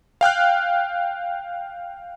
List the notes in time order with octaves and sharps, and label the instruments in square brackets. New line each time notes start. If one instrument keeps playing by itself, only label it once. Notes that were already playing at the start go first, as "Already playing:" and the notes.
[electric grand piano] F5 G5 F6 F#6